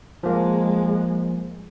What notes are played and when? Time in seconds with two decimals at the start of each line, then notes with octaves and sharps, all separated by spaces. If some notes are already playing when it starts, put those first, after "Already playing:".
0.23 F3 G#3 A#3